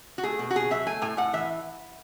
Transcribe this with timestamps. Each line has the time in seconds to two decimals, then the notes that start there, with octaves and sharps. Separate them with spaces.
0.18 F#4
0.23 A3 G#4
0.39 B2
0.50 F#4
0.55 B2 G#4
0.71 F#3 E5
0.87 A3 G#5
1.02 A2 G#5
1.17 A2 F#5
1.33 E3 E5